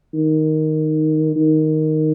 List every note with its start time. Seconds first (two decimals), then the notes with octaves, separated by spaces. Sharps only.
0.13 D#3
1.36 D#3